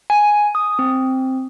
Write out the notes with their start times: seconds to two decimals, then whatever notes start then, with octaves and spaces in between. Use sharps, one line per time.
0.10 G#5
0.55 D#6
0.79 C4